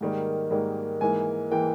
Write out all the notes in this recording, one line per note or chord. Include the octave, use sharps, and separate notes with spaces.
G#2 D#3 G3 A#3
G#2 D#3 G3 A#3
G#2 E3 A#3 G#5
E3 A#3 G5